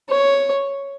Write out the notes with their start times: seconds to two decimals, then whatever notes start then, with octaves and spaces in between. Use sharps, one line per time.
0.09 C#5